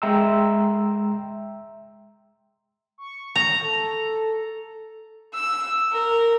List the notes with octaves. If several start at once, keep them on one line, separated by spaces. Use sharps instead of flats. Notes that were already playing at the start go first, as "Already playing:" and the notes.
G#3 E5 G5 A#5 C6 E6
C#6
A#5
A4
E6
A#4